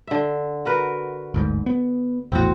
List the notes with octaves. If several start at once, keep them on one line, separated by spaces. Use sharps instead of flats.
D3 E5
F#4 A#4 B4
G1 D2 G#2
B3
A#1 E2 A2 C4 F#4